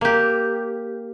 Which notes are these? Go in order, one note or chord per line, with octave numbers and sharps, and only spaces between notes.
A#3 G4